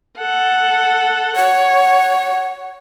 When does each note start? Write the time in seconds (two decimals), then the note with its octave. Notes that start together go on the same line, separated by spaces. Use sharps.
0.18 A4 F#5
1.36 C#5 F#5